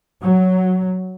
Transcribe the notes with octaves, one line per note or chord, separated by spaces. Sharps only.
F#3